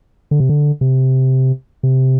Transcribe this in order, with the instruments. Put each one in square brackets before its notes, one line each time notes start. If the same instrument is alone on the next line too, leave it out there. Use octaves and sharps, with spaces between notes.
[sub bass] D3
C3
D3
C3
C3